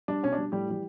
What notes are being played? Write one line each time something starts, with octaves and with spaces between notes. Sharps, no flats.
G3 D4
B2 C#4
D4
G3
A2 G3 G4
E3 G3